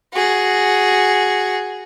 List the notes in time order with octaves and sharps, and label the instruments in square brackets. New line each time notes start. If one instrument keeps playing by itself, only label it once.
[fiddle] F#4 G#4